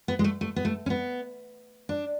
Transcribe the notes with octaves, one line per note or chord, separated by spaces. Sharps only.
B3
G#3
A3
A3
B3
A3
C#4
B3
D4